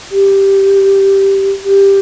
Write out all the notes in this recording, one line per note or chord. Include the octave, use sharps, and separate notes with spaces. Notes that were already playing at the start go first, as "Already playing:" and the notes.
G4
G4